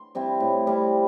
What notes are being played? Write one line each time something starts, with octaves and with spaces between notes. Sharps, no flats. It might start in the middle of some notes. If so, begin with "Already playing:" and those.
Already playing: C6
G3 C4 E4
A2
G3 C4 E4